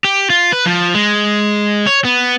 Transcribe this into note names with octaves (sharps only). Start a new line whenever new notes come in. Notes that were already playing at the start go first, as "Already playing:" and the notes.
G4
F4
B4
F3
G#3
C#5
B3